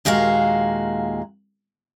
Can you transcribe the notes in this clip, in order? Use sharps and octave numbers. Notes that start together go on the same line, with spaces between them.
D#2 A#2 G#3 F#4 F5